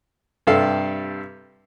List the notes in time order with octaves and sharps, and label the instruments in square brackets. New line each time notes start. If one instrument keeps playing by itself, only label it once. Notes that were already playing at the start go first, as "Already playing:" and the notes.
[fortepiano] G2 C3 G3 A4 F5